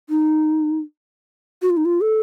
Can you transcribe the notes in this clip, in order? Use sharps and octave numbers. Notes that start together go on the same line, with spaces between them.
D#4
F#4
F4
D#4
F4
A4